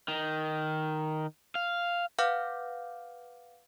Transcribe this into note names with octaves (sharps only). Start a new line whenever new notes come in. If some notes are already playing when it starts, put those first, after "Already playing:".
D#3
F5
B4 F5 F#5 D6 F6 G6